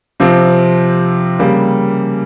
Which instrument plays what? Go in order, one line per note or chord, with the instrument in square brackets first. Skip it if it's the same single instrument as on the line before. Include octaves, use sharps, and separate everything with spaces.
[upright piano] C3 F3 C4
C#3 G3 A#3